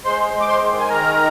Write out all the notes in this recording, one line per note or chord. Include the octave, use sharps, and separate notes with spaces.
G#3 C5 C6
G#3
D6
C5 C6
D#3
G#5
D#3 A#4 A#5